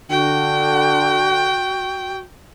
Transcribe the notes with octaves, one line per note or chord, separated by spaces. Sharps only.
D3 F#4 G5